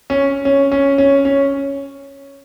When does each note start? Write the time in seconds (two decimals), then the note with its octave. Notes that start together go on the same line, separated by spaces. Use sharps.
0.10 C#4
0.45 C#4
0.72 C#4
0.98 C#4
1.25 C#4